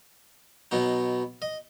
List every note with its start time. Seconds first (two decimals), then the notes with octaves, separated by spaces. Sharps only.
0.71 B2 F#3 B3 D#4
1.42 D#5